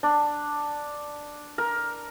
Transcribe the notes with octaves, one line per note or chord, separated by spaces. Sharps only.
D4
A#4